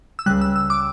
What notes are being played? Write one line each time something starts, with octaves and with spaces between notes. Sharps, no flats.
E6
C#2 C#3 G3 F#6
E6
E6
D6